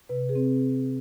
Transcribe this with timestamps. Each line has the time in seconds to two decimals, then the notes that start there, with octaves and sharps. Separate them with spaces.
0.09 C3 B4
0.29 G#4
0.35 C4